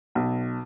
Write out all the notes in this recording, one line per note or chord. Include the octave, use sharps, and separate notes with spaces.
B1